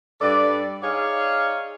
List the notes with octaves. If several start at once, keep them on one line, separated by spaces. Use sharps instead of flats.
G2 A4 B4 D5
D#4 G#4 C#5 D5 F5